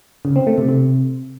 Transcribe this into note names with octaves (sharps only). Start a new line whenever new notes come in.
C#3
C4
A3
C3
C3